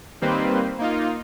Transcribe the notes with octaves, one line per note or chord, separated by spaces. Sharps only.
D#3 G3 A#3 C4 B4 C5
A#3 D#4 F4